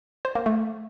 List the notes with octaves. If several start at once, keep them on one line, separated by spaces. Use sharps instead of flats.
C5
A#3
A3